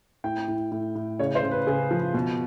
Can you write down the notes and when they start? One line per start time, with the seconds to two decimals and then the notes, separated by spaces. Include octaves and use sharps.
0.24 A2 G5
0.48 A2
0.72 A2
0.95 A2
1.19 C#3 C#5
1.35 C5
1.43 C#3
1.51 B4
1.67 C#3 G#4
1.91 F3
2.14 B2